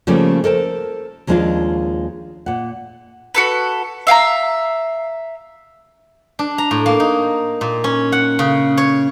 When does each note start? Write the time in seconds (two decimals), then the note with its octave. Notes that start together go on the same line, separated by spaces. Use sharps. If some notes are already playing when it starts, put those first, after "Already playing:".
0.07 C#3 F3 G3 A3 A#3 C#4
0.44 A4 A#4 C5 A5
1.27 D#2 F3 G#3 C#4 D4 F4
2.46 A#2 F#5
3.34 F#4 A4 B4
4.07 E5 F5 G5 A#5
6.39 D4
6.58 A#5
6.71 A2
6.86 A#3
7.00 D#4
7.61 A#2
7.84 C#4
8.12 F#5
8.39 C#3
8.77 C#5